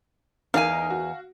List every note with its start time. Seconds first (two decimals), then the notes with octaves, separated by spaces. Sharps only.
0.54 E2 D4 D#4 A#4 F5 G#5
0.90 F#4